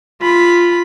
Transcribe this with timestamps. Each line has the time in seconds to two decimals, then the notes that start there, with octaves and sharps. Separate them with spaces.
0.21 F4 B5